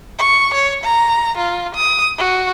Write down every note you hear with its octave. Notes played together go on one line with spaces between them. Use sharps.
C#6
C#5
A#5
F4
D#6
F#4